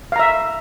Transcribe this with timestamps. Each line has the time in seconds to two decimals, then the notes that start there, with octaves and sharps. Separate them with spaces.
0.12 F5
0.16 A#5
0.19 E5